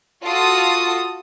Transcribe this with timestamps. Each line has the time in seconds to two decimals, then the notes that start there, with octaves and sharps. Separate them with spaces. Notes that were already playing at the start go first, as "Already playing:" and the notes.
0.22 F4 F#4 A4 D#6